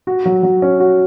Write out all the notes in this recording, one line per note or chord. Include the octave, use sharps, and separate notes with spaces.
F#4
F#3
F#3
C#4
F#4